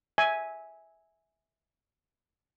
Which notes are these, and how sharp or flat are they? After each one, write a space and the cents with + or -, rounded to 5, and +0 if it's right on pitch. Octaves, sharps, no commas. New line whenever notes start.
E5 -15 G#5 +0